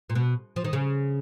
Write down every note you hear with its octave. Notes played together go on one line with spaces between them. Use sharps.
A#2
B2
F3
D#3
C#3